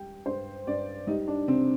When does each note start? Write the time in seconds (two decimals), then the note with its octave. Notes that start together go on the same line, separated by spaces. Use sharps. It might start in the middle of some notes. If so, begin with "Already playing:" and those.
Already playing: G3 G5
0.26 G2 C5
0.67 G2 D5
1.07 G3 D#4
1.28 D4
1.48 C3 C4